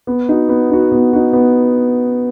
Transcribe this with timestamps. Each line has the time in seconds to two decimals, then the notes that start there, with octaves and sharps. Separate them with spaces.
0.07 B3
0.29 D#4 F#4
0.49 B3
0.70 D#4 F#4
0.92 B3
1.13 D#4 F#4
1.33 B3